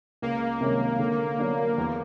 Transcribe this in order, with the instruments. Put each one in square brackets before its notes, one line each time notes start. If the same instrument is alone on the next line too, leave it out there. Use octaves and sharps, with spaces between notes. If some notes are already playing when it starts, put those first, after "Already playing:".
[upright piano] C#2 [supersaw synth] A#3
[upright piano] C3 D#3 G#3 C#4
D3
F#3 B3 D4
E2